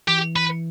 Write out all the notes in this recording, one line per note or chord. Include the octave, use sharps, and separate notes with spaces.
E3 G4
B4